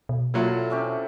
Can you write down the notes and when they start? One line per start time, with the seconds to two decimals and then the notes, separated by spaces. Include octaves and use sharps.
0.09 B2
0.34 A#2 F#3 E4 F4 A4
0.70 C3 C#4 G4